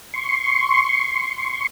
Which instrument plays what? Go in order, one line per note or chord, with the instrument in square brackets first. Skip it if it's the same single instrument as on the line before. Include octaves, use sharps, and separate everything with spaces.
[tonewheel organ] C6 C#6